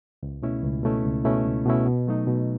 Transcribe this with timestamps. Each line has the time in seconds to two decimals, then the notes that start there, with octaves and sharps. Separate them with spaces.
0.23 C#2
0.42 B2 A3 C#4 E4
0.64 C#2
0.83 B2 A3 C#4 E4
1.04 C#2
1.24 B2 A3 C#4 E4
1.45 C#2
1.65 B2 A3 C#4 E4
1.86 B2
2.07 F#3 A3 D#4
2.27 B2